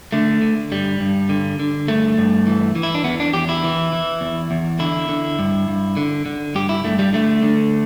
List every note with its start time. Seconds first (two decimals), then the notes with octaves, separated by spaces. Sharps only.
0.12 D3 A3
0.42 D3
0.72 G2 G3
1.00 G2
1.29 D3
1.60 D3
1.88 G2 A3
2.18 G2
2.47 E3
2.75 E3
2.83 E4
2.95 D4
3.04 E2 B3
3.20 D4
3.33 E2 G4
3.49 E4
3.64 E3
3.93 E3
4.21 E2
4.51 E2
4.79 D3 E4
5.09 D3
5.39 G2
5.68 G2
5.97 D3
6.26 D3
6.55 G2 G4
6.69 E4
6.84 G2 A3
6.99 G3
7.13 D3 A3
7.42 D3